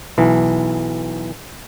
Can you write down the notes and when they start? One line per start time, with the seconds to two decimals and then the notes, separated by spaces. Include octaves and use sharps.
0.18 B1 E3